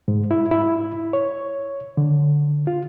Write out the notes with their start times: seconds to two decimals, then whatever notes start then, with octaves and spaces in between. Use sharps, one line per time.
0.08 G#2
0.31 E4
0.51 E4
1.13 C#5
1.97 D3
2.67 F4